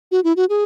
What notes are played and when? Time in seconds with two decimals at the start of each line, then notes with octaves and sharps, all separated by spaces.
0.11 F#4
0.24 E4
0.37 F#4
0.49 G#4